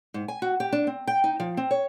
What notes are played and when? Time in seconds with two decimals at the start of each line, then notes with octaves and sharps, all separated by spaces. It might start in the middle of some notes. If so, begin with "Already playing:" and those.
0.14 G#2
0.28 G#5
0.42 F#4
0.60 G4
0.72 D4
0.87 C4
1.07 G5
1.24 D#4
1.40 F3
1.57 C4
1.71 C#5